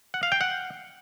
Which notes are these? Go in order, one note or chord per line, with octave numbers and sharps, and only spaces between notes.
F#5
F5
G5
F#5